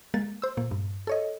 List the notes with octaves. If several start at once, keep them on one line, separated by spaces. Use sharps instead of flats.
G#3 A#3 A6
C5 E6
A#2 A#3
G2
A4 C#5 D#5